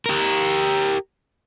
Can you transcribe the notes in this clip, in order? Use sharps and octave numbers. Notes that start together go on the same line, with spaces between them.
G4 A#4